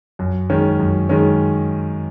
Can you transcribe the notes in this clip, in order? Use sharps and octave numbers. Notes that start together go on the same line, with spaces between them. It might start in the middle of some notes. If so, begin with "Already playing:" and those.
F#2
D#3 G#3 C#4
F#2
D#3 G#3 C#4